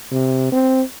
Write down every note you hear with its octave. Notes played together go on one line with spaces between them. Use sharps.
C3
C4